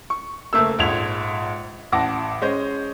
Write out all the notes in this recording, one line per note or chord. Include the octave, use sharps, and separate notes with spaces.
C#6
F#1 A3 A#3 E6
A#1 G#2 G#6 F7
A1 F#5 A5 D6 A#6
G#3 C#4 C5 D#5